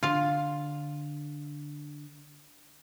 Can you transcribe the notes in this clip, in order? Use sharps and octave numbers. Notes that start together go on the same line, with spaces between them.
D3 F4 F5